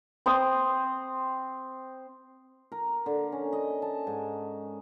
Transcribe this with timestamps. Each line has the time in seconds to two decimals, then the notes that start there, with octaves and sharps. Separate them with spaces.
0.26 C4 C5 D#6
2.72 A#4
3.06 D3
3.32 C#4
3.53 D#5
3.82 A5
4.07 G#2